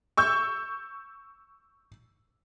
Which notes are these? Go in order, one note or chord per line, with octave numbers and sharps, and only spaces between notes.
C#6 E6 G6